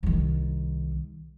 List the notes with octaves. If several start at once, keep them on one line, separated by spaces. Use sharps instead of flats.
C2 D#3